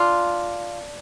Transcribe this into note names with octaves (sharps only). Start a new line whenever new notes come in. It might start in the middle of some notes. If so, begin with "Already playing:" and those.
Already playing: D4 F4